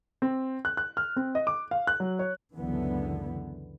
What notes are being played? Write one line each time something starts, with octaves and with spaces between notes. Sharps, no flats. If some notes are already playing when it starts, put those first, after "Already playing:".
C4
F#6
F#6
F6
C4
D#5
D6
F5
F#6
F#3
C#5
C#2 F#2 D3 E3 B3